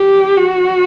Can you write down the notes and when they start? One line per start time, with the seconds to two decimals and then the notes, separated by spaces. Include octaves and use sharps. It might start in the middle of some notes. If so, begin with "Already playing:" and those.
Already playing: G4
0.37 F#4